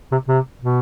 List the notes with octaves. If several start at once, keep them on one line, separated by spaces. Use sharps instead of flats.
C3
C3
B2